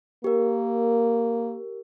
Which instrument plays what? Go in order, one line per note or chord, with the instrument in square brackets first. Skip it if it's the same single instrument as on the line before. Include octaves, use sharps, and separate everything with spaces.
[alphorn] A#3 [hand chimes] G4 A#4